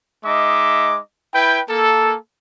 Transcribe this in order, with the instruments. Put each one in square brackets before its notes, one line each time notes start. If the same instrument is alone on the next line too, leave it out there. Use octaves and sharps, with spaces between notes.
[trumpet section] G#3 D#4 D#5 E5 D6
E4 B4 G5
A#3 A4